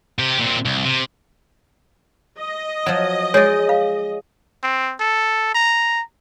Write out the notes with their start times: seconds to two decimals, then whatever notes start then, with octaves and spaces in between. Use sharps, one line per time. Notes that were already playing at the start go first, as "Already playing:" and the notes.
0.19 C3 G4
0.40 A#2 C4
0.65 C2
0.84 C3
2.38 D#5
2.86 F3 F#3
3.34 G#3 C#5 D5
3.69 F5
4.63 C4
5.00 A4
5.54 A#5